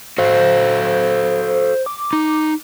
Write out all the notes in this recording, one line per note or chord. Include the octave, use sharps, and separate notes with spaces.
F#4 A4 C5 F5
D6
D#4